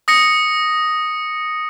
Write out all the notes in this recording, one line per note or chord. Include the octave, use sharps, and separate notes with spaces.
D#6 A#6 C#7